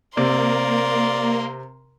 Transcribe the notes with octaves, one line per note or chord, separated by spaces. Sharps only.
C3 A#3 A#4 D5 C6